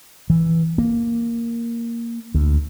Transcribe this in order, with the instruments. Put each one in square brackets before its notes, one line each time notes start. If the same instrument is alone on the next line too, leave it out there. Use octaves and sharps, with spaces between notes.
[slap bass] E3
A#3
D2